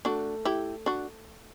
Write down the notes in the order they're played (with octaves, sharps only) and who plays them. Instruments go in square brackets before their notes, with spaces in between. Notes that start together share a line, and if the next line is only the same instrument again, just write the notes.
[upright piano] A3 [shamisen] D4 F#4
[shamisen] E4 G4
D4 F#4